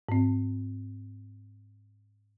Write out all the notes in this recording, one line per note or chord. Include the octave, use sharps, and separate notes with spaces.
G#2 C4